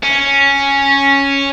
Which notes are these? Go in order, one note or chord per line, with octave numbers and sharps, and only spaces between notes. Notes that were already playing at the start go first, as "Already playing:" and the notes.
C#4